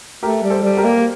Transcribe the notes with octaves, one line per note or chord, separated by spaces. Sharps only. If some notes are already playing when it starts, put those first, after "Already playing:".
A3 G4 A#4
G3
A4 C5
G3
G4 A#4
A#3